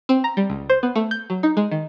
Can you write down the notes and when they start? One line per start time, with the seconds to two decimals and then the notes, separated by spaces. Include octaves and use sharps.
0.09 C4
0.24 A#5
0.37 G3
0.50 C#2
0.69 C5
0.83 B3
0.96 A3
1.11 G6
1.30 F#3
1.43 D#4
1.57 G#3
1.72 D#3